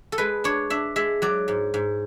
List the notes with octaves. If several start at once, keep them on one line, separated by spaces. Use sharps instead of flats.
A4
G#3 B4
D4 C#5
D4 E5
G#3 E5
F#3 D5
G#2
G#2